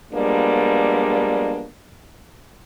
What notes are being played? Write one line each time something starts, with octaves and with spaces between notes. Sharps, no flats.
F3 G3 G#3 A#3 B3 D4